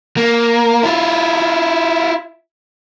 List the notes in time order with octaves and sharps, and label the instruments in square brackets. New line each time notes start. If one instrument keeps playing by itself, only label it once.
[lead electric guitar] A#3
E4 F4